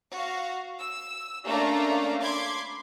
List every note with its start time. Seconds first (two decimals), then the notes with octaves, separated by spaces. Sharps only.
0.11 F#4 F5
0.78 E6
1.46 A3 A#3 C#4 D4 F5 A#5
2.21 B5 C6 D6 G#6